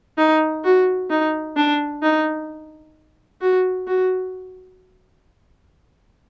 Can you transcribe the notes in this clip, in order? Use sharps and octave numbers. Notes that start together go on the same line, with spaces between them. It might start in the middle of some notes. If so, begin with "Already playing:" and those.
D#4
F#4
D#4
D4
D#4
F#4
F#4